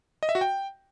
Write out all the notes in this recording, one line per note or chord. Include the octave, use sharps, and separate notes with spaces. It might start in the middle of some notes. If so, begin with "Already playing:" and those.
D#5
E5
F#4
G5